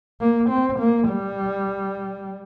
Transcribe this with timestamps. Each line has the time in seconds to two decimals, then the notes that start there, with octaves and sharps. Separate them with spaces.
0.21 A#3
0.50 C4
0.79 A#3
1.08 G3